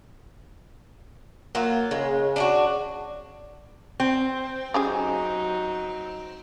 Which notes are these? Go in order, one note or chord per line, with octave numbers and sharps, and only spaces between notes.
F#3 A#3 F4
C#3 G#3
D4 F4 F#4
C4
F#3 C#4 D#4 G4 G#4